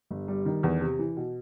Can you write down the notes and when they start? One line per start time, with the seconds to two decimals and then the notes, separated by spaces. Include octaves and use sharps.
0.11 G1
0.28 G3
0.45 D#3
0.63 E2
0.81 C3
0.99 E3
1.17 B2